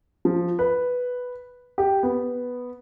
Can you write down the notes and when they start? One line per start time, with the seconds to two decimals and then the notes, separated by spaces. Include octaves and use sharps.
0.25 F3
0.59 B4
1.78 G4
2.03 B3